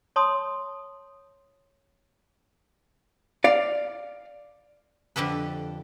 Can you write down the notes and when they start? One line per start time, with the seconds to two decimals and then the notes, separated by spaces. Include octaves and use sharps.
0.16 C#5 A5 C6 D#6
3.44 D5 F5
5.16 F2 D3 G4 A4 B4